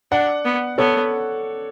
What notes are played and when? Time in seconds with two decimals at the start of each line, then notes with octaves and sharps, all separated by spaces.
0.12 D4 D5 F#5
0.45 B3
0.78 B3 A4 C#5